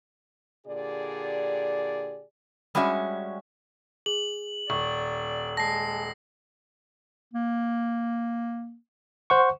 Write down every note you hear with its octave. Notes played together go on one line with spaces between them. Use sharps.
A#2 D3 G4 G#4 D5
G3 G#3 C#4 F#4 E5
G#4 F#7
D#1 D5 C#6
G#3 A5 A#6 C7
A#3
C5 F#5 C#6